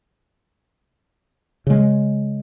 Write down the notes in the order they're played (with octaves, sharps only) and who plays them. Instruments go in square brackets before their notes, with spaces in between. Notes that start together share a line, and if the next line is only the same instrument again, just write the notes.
[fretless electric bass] C#3 G#3